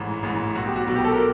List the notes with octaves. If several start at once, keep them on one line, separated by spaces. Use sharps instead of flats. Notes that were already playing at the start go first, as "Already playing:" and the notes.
Already playing: A1 G#2 E3
A1 G#2 E3
B1 B2 F#4
G4
F#4
B1 B2 F#4
G4
A4
A#4